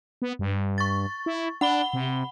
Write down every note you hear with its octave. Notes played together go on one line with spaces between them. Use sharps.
B3
G2
C#6 A6
E4
D4 F#5 B5 G7
C3